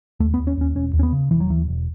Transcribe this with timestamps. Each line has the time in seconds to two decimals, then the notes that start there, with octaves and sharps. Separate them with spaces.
0.20 D#2 A3
0.34 B3
0.38 D#2
0.47 C#4
0.57 D#2 C#4
0.75 E1 C#4
0.93 D#2
0.99 C#4
1.03 B3
1.12 C#3
1.31 E1 E3
1.40 F#3
1.50 D#2 E3
1.68 E1